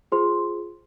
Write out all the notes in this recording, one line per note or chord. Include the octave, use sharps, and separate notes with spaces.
F4 G#4 C5 C6